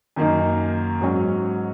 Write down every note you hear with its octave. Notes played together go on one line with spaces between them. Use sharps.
F#2 D#3 A#3 D#4
G#2 F#3 C#4